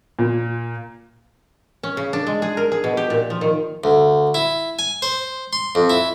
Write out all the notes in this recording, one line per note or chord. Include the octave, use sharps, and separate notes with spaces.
A#2
C#4
C#3
D4
G#3
G#4
A#4
G#4
B2
G4
A#2
F3
D#3
D2
E4
G#5
C5
C6
F2
E4